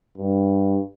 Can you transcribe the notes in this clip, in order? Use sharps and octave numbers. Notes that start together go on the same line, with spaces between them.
G2